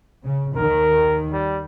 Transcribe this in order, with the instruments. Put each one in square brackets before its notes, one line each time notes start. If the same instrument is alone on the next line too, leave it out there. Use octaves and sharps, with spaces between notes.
[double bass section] C#3
[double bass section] D#2 D#3 [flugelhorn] A#4
[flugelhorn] G3